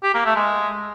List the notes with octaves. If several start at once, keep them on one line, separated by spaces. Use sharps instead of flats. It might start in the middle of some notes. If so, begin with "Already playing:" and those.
G4
A#3
A3
G#3